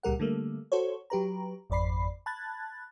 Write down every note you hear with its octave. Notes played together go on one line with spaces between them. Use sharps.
C#2 A#2 G3 A#4 F#5
D3 G3 A3 A#3
F#4 A4 C5 C#5
F#3 G4 B4 A#5
G#1 F2 D5 B5 C7
A5 B5 F#6 G#6 A6